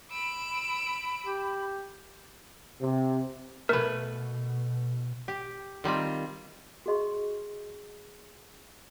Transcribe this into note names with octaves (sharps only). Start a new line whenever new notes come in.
B5 E6 D7
G4
C3
B2 A3 A#4 B4
G4
D#3 G3 C4 F4
F#4 G#4 D#5 C6 C#6